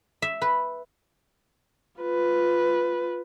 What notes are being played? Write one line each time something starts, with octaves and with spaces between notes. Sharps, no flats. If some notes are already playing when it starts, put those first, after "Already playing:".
E5
B4
F4 B4